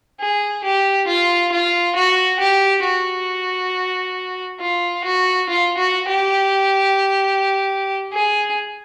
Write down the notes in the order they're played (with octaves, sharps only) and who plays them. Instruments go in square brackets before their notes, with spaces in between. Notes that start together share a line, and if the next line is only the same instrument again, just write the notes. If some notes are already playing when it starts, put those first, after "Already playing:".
[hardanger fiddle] G#4
G4
F4
F4
F#4
G4
F#4
F4
F#4
F4
F#4
G4
G#4